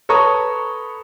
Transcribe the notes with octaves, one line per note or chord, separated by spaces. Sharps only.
A4 B4 C#5 A#5 C#6 D#6